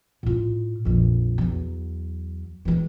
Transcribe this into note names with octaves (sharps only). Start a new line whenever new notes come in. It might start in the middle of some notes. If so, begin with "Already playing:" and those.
A2 F4
A#1 F2
E2 F#3
E3 G#3